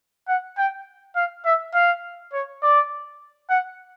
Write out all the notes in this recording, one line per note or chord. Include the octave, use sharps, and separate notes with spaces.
F#5
G5
F5
E5
F5
C#5
D5
F#5